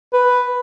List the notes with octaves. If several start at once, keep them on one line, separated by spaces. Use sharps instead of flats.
B4